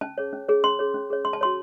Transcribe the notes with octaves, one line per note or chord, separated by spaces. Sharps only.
C#4 A5
G#4 C#5
C#4
G#4 C#5
C#4 C6
G#4 C#5
C#4
G#4 C#5
C#4 C6
A5
F#4 C#5 C6